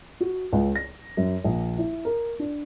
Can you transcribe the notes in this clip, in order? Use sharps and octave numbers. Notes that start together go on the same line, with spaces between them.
F#4
C#2
A#6
F#2
A#1
E4
A#4
D4